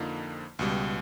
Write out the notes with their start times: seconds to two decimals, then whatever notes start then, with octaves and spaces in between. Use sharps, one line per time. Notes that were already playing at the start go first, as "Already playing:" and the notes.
Already playing: F2 D3 F3 A#3 D#4
0.59 C#2 B2 G3